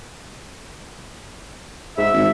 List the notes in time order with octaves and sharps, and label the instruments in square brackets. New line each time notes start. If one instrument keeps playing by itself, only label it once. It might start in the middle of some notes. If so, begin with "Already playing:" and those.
[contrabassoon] G#2 [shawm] E5
[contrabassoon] G#1